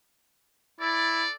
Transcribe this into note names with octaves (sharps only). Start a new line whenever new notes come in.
E4 A4 D5